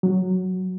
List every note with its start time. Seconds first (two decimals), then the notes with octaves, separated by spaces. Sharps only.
0.03 F#3